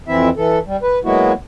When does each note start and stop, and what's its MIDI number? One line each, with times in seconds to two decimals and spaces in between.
0.08 0.29 41
0.08 0.29 52
0.08 0.29 60
0.08 0.29 64
0.08 0.29 76
0.37 0.59 52
0.37 0.59 69
0.66 0.77 55
0.83 0.99 71
1.05 1.32 54
1.05 1.32 56
1.05 1.32 58
1.05 1.32 59
1.05 1.32 64
1.05 1.32 66